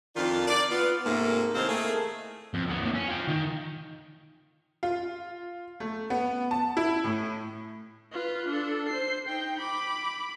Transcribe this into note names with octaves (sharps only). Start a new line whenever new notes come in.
F2 D#3 D4 F4
D5
B3 F4
G#2 C3 A3 A#3
A2 C3 D#3 C4 C5 F5
A3 A#3 G#4
F2
D2 B3
D#2 A2
C#4
F4 G5
D#3
F4
A3
B3
A5
E4
A2
F4 B4
D4 A4
C5 C7
D#4 G5
B5 D6